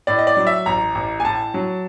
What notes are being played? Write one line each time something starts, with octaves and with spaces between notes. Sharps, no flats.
A2 D5
D#5
D5
F#3
E5
A1 A#5
A1
G#5
A2 A5
F#3